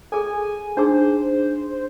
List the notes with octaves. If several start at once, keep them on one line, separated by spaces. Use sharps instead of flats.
G#4 A4 G#5
D4 D#4 G#4 C5